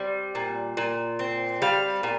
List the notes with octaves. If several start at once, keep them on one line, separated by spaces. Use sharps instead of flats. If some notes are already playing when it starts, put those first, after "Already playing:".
Already playing: G3 C4 G5
A#2
A#2
C4
G3 F5
A#2